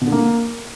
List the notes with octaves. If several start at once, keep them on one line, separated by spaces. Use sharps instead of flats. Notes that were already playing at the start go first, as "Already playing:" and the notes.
B2
D3
A#3